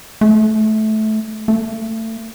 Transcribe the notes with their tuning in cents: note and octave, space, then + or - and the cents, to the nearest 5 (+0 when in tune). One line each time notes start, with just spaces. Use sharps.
A3 -20
A3 +30